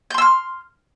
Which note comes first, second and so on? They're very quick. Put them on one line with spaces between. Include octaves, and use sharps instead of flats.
G6 C6 E6 F6